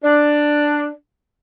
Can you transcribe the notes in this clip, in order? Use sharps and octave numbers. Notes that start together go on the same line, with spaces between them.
D4